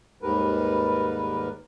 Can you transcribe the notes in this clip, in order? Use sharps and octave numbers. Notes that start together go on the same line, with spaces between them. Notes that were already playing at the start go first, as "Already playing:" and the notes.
D#2 G#2 G3 A#4 B4